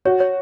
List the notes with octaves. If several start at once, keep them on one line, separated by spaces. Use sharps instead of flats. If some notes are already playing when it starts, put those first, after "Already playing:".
F#4 C#5
C#5